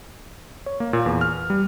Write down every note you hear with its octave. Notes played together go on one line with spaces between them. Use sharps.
C#5
A#3
A#2
E2
F6
G3